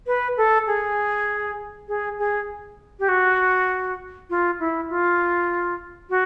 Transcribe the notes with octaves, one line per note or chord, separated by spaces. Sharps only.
B4
A4
G#4
G#4
G#4
G4
F#4
F4
E4
F4
F#4